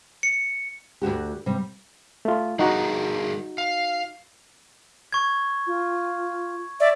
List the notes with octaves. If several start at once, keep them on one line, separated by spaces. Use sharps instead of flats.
C#7
D2 A#2 F#4 G4
C3 G3
A3 F4
G3 D#4 F#4 G#4 A#4
F5
C#6 G#6
F4
D5 E5